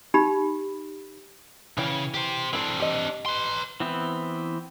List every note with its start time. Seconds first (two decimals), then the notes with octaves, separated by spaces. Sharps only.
0.14 D#4 G4 B5
1.78 C#3 E3 G5
2.14 G4 C5
2.53 C4 D4 E4 A4
2.80 G4 D#5
3.26 B4 C6
3.80 E3 B3 C4 E4